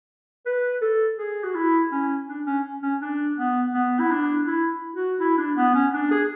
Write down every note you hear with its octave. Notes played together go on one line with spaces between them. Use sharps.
B4
A4
G#4
F#4
E4
C#4
D4
C#4
C#4
D4
B3
B3
E4
D4
E4
F#4
E4
D4
B3
C#4
D4
G#4